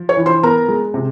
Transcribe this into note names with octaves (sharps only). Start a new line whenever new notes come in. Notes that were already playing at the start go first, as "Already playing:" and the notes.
Already playing: F3
C#5 C#6
E3
C5 C6
B3 A#4 A#5
G#3
C3